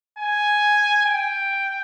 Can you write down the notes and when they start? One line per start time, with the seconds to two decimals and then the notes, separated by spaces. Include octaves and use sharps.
0.19 G#5
1.06 G5